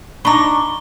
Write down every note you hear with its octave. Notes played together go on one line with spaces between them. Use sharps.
D4 D#4 A#5 B5 C#6 D6 G7